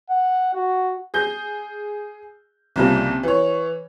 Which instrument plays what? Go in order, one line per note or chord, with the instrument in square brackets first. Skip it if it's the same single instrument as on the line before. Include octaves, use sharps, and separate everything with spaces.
[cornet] F#5
F#4
[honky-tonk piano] G#4 G6
C2 C#3 F3 G3 A#3 A5
E3 C#5